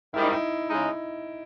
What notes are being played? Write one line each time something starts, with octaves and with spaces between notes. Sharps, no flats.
G#2 D#3 G3 E4
D#4
E4
C#3 G#3 D#4